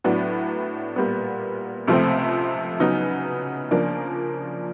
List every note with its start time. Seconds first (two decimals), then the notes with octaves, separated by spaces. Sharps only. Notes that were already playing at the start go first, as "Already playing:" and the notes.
0.04 A2 F#3 B3 D4
0.96 A#2 G3 B3
1.87 C#2 C3 F3 A3 C4
2.80 C#3 F#3 B3 D#4
3.71 C#3 F3 A#3 D4